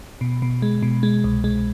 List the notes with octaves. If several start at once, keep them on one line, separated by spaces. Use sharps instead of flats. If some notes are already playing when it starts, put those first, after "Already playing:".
B2
B2
G#3
B2
G#3
C2
G#3